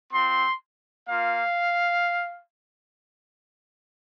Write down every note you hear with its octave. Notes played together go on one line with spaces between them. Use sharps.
C4 F4 C6
A#3 F4 F5